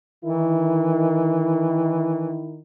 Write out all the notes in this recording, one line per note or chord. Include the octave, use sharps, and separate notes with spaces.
D#3 E3 E4